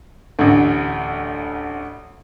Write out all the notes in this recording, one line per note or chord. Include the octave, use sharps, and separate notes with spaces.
A1 D2